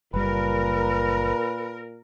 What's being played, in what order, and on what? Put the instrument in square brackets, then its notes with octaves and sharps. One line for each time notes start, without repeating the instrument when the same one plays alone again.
[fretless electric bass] F#1 G3 [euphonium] A#2 [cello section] A#4 [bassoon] B4